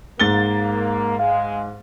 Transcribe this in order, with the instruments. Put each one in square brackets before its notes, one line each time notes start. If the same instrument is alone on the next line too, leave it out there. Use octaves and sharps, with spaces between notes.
[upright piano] G#2 A6 G7 [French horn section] A#3
[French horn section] G#3 [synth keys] F5